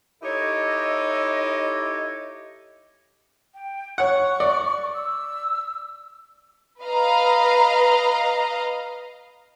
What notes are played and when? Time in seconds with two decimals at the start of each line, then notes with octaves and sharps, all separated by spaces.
0.22 D#4 E4 G4 A4 C#5 D#5
3.54 G5
3.98 C#5 F#5 C#6
4.40 D5
4.94 E6
6.83 B4 D#5 F5 A#5